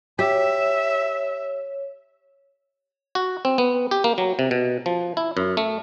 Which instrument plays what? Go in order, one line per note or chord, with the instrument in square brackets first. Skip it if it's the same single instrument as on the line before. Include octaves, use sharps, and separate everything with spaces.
[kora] G4 [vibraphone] C#5 [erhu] E5
[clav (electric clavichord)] F#4
C4
B3
G4
A#3
F#3
C3
B2
F3
E4
F#2
A3